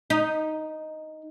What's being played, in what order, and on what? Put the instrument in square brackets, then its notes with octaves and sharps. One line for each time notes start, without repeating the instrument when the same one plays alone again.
[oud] D#4